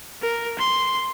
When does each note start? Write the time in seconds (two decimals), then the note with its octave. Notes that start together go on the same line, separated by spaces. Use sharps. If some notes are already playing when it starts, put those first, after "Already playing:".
0.23 A#4
0.59 C6